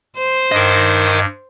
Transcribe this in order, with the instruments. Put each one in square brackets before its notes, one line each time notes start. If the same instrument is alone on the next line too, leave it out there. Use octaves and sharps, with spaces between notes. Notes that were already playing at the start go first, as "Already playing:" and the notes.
[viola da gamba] C5
[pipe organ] G2 [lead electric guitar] A#4 D#5